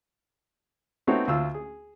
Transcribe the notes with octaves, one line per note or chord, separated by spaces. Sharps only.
A3 B3 C4 D#4 F#4 C#5
D2 F4 E6
G#4